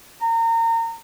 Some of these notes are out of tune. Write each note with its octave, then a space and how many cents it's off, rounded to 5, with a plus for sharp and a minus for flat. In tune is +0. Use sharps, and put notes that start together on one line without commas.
A#5 -30